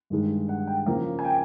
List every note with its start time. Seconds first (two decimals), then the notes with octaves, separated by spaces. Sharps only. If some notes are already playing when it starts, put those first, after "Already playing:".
0.10 G2 D#3 G#3
0.49 F#5
0.67 G5
0.86 C#3 F3 A#3
1.19 G#5
1.25 G5